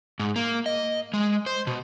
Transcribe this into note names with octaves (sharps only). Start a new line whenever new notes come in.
G#2
A#3
D#5
G#3
C5
B2